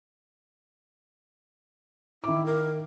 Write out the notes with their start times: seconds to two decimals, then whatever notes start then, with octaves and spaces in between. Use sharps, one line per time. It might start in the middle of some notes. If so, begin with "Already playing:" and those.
2.24 D#3 E4 D6
2.46 A#4